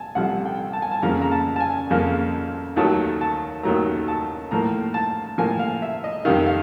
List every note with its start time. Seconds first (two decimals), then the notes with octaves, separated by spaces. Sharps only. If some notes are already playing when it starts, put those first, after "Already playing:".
Already playing: G#5 A5
0.15 C2 C3 F3 A3 F#5
0.45 G5
0.73 A5
0.82 G#5
0.91 A5
1.02 F2 C#3 F3 A#3 A#5
1.21 A#5
1.32 A5
1.56 A5
1.60 G#5
1.91 F2 C#3 F3 A#3
2.76 D#2 D#3 F#3 A3 A5
3.21 A5
3.63 D#2 D#3 F#3 A3 A#5
4.08 A5
4.51 A2 F3 A#3 A#5
4.94 A5
5.38 A2 F3 A#3 G#5
5.59 F5
5.82 E5
6.04 D#5
6.25 F2 C3 D#3 F5
6.46 F5